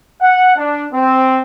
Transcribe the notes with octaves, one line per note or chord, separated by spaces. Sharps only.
F#5
D4
C4